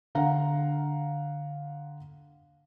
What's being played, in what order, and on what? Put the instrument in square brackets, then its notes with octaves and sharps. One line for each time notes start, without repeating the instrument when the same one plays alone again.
[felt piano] D3 F5 F#5 A#5